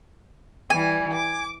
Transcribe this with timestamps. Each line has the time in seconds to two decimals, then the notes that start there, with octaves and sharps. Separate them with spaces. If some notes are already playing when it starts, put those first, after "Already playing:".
0.70 E3 G3 G#5
1.13 D6